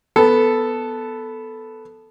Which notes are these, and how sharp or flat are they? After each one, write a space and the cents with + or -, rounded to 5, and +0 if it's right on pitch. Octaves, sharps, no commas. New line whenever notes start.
B3 +0 A4 +0